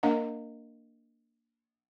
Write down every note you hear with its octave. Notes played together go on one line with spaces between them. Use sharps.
A#3 D4 A#4 D#5 F5 F#5